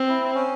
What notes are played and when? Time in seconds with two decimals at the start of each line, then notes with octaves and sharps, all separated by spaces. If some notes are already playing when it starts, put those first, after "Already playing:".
Already playing: C4
0.09 E4
0.34 C#4